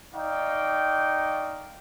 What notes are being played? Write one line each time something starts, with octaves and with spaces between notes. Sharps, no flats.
D#4 D5 F5 G5 C#6